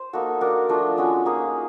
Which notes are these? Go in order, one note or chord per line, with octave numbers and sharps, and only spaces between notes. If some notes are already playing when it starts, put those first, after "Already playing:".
Already playing: C5
A#3 D#4 F#4 A4
D4 F#4 A#4
F3 A3 D4 F4
G#3 C#4 F#4
A#3 D#4 G#4